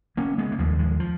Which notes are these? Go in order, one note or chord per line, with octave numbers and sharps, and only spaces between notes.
C#3 A#3 C#4
G#3 B3
A#3
D#2 F3 G#3
F3 G#3
F3